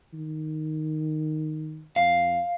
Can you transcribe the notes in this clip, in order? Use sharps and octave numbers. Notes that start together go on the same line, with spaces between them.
D#3
F2 F5